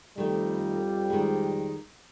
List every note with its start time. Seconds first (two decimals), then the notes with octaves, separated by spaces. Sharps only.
0.18 F2 D#3 G3 A3
1.10 D#3 G#3